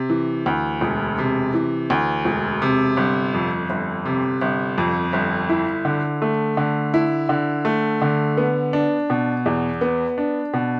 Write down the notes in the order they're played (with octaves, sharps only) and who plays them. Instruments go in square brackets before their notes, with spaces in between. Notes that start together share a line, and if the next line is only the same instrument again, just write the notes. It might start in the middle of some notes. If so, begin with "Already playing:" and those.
Already playing: [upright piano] C3
E3
D2
E1
C3
E3
D2
E1
C3
G1
F2
G1
C3
G1
F2
G1
E4
D3
A3
D3
E4
D3
A3
D3
B3
D4
B2
E2
B3
D4
B2